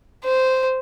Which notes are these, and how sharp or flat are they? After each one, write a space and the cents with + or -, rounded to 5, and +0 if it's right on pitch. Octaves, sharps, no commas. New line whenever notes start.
C5 -10